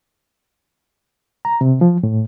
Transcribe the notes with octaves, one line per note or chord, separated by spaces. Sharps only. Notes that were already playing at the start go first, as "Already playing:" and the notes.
A#5
C3
F3
A2